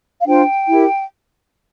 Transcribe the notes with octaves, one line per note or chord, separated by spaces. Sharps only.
F5
D4 F4 C5 G5
E4 G4 A#4